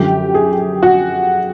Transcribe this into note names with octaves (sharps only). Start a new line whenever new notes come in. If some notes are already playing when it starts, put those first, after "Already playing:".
Already playing: F#2 D3 F3 G4
G#4
F#4